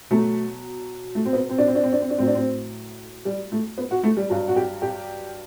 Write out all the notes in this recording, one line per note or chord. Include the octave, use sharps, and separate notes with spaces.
B2 F#3 A3
A3
C4
B3
C4
D4
C4
D4
C4
D4
C4
D4
A2 F#3 C4
D4
C4
G3
A3
B3
F#4
A3
G3
G2 F#3
F#4
G4
G4